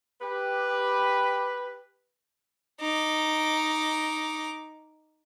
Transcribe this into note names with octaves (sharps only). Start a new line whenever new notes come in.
G4 B4
D#4 D6